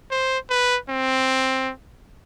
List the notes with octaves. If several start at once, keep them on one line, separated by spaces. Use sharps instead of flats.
C5
B4
C4